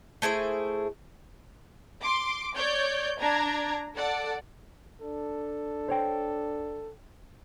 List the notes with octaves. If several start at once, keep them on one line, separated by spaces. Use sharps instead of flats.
A3 E4 G#4 C5
C6 D6
C#5 D5 G6
D4 A#5 G#6
A4 D5 F#5
D4 A4
C5 C#5 G5